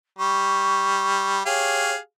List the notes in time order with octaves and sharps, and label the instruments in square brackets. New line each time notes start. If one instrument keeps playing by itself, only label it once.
[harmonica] G3 [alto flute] C#6
[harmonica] G4 G#4 F5 [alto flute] C#5